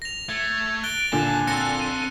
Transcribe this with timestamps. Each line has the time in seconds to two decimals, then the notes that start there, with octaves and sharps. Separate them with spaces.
0.02 A#6 F7
0.29 A3 G#6
0.83 F#6 A6 D7 G7
1.13 D#2 A#2 D3 G#5 A5
1.47 C4 A4 F#6 A#6 C#7
1.80 D#7